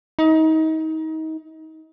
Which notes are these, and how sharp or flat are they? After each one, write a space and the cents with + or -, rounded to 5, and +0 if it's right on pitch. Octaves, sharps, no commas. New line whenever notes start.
D#4 +30